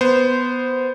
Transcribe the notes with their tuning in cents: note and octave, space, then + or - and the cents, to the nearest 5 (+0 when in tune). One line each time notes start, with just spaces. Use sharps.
B3 +0 C5 -15